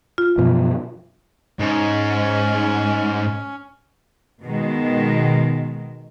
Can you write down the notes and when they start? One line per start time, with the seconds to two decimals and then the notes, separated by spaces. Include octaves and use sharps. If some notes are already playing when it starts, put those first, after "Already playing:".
0.18 F4
0.38 F#2 B2 F3
1.59 G#2 C#4
4.43 B2 D#3 G#3